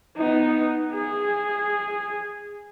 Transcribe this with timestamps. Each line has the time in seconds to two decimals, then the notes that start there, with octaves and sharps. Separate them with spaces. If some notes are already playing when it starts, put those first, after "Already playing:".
0.17 B3 D#4
0.93 G#4